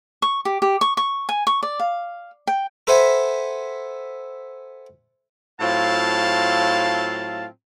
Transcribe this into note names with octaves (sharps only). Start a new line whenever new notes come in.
C#6
G4
G4
C#6
C#6
G#5
C#6
D5
F5
G5
A4 B4 C5 E5 F#5 G#5
A2 F#3 C4 F4 F5 A5